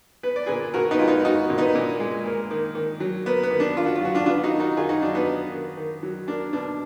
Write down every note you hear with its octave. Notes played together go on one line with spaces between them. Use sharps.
B3 B4
D5
A#2 G#4 B4
A#2 F#4 A#4
B3 D#4
G#3 F4
B3 D#4
B3 D#4 F#4
A#2
B3 D#4
A#2
G#3
A#3
D#3
D#3
F#3
A#3 B3
B3
D#3
D4
D#3 F4
F#4
F4
F#3 F#4
D4 F4
B3 D4 F4
D#4 F#4
D#3
D#4 F#4
D#3 F4 G#4
D#4 F#4
F#3 D4
B3 D#4
B3
D#3
D#3
F#3
A#3 D4
B2 D4